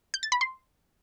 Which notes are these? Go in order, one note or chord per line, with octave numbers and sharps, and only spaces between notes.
G6
A6
B5
C6